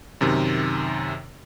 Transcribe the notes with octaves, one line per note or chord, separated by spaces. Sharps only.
F#2 C3 D#3